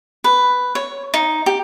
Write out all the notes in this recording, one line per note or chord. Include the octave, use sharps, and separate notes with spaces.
B4
C#5
D#4
G4